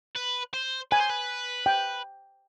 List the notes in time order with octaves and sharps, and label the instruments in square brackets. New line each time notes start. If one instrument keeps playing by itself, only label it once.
[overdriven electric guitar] B4
C5
[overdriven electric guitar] B4 [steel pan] G#5
[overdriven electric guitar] C5
B4
[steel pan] G5